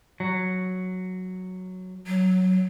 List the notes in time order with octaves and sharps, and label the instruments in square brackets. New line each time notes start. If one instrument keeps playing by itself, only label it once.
[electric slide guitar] F#3
[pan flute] F#3